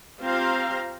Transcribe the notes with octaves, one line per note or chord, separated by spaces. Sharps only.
C4 F4 G4 C5 F5 A#5